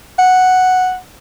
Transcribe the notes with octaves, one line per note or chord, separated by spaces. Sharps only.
F#5